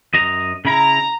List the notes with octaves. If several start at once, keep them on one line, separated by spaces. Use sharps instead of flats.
F#2 D#5 A#5
C#3 E4 A#5